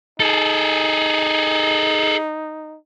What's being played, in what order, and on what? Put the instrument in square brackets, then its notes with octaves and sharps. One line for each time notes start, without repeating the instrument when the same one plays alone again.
[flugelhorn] D#4 [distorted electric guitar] G#4 A4